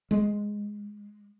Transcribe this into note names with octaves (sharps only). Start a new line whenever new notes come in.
G#3